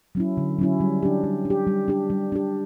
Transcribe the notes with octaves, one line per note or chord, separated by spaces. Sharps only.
F#3 C#4 E4
D3
F#3 C#4 E4
G3
D4 G4
G3
D4
G4
G3
D4 G4
G3
D4 G4